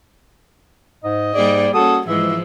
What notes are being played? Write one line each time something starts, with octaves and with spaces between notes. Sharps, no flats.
G#2 D#5
G#2 G3 A#3 G#4 D5
A#3 C#4 F#4 A4 D#6
G#2 E3 F3 G#3 E5